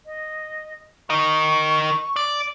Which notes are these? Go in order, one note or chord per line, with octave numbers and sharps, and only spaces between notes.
D#5
A#4 D#5 C#6
D5